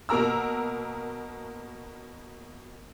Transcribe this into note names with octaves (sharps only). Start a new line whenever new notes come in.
B2 A#3 A#4 A#5 E6